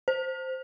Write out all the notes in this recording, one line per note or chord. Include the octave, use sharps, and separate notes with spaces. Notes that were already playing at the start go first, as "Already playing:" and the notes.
C5